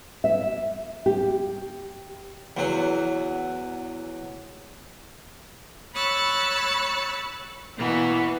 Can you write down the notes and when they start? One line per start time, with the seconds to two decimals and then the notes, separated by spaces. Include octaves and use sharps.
0.24 E5
1.06 G4
2.57 E2 F#3
5.94 C#5 B5 E6 F#6 A6
7.77 B2 E3 A#3 B3